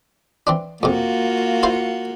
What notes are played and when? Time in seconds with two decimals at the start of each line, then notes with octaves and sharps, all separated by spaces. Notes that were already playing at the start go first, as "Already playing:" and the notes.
0.47 E3 C4 D4
0.83 F2 C3 A#3 F4 F#4
1.63 E4 C5 F5